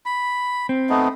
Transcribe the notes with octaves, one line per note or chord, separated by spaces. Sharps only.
B5
C4
A3 B3 D#4